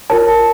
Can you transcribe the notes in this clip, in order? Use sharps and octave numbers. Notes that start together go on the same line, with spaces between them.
F4 A#4 C#5 A5